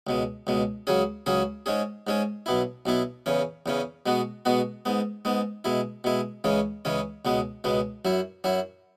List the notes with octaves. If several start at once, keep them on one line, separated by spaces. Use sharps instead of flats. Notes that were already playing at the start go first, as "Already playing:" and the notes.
C#2 B2 G#3
C#2 B2 G#3
C#2 C#3 F#3 C#4 G#4
C#2 C#3 F#3 C#4 G#4
G#2 G#3 C#4 G#4
G#2 G#3 C#4 G#4
B1 B2 B3 E4
B1 B2 B3 E4
E2 C#3 E3 C#4
E2 C#3 E3 C#4
B2 G#3 B3 F#4
B2 G#3 B3 F#4
G#2 G#3 B3
G#2 G#3 B3
B2 G#3 E4
B2 G#3 E4
C#2 C#3 E3 G#3 C#4
C#2 C#3 E3 G#3 C#4
C#2 B2 G#3 B3
C#2 B2 G#3 B3
F#2 F#3 E4
F#2 F#3 E4